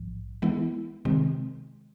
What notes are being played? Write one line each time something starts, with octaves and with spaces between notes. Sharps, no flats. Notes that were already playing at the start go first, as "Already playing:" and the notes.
Already playing: A#1 G#2 F3
E3 G#3 B3 E4
C3 D#3 G#3 C4